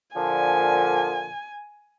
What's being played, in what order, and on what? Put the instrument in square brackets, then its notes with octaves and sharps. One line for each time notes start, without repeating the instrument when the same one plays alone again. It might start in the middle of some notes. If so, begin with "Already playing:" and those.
[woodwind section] A#2 D3 F3 [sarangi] G#5